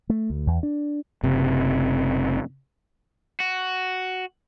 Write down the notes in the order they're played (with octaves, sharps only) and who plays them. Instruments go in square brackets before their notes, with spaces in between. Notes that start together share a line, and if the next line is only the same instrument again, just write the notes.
[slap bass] A3
D2
E2
D4
[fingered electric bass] F#1 C3
[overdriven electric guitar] F#4